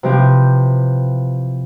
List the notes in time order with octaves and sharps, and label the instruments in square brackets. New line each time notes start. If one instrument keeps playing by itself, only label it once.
[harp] C3 E3 F3 C4 G4